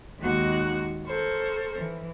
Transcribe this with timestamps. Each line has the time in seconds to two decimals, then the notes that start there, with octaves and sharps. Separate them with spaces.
0.20 D#2 G#3 A#3 D#4 F#4 F#6
1.05 A4 A#4 C5 C#6
1.76 E3